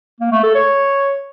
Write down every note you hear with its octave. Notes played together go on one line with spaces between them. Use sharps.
A#3
A3
A4
C#5